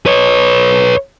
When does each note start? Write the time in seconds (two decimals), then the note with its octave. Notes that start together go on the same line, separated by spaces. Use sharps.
0.06 B4 C#5